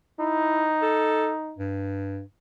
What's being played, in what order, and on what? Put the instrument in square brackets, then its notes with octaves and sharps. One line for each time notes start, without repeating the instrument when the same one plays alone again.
[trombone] D#4 [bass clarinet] E4
[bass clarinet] A4
G2